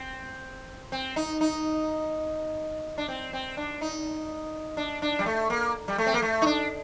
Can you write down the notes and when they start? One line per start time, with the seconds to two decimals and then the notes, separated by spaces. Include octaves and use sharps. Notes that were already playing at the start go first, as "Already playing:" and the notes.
Already playing: C4
0.92 C4
1.16 D#4
1.41 D#4
2.98 D4
3.08 C4
3.33 C4
3.57 D4
3.81 D#4
4.77 D4
5.02 D4
5.19 G3
5.26 A3
5.50 A#3
5.88 G3
5.98 A3
6.07 C4
6.14 A#3
6.22 A3
6.42 D#4
6.46 D4